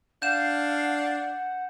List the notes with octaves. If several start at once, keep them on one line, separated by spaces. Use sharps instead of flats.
D4 F5 F#5 G6 E7